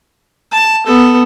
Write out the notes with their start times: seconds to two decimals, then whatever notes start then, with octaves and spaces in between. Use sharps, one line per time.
0.52 A5
0.86 B3 A4